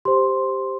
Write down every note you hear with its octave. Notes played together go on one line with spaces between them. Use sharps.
G4 C5 C6